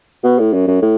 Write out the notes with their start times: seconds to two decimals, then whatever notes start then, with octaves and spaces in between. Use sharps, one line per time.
0.24 B2
0.39 A2
0.53 F#2
0.68 F#2
0.82 A2